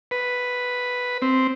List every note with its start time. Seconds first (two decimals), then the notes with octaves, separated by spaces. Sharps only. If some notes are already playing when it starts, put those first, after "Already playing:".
0.11 B4
1.22 C4